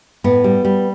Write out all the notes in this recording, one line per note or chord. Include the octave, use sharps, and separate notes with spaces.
A2 B3
G3
G3